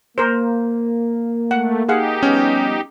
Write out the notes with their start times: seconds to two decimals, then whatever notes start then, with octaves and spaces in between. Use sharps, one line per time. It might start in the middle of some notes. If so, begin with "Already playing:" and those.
0.18 A#3 A#4 C5
1.51 A3 F#5
1.89 D#4 G4 G#4 F5 F#5
2.23 F3 G3 B3 C#4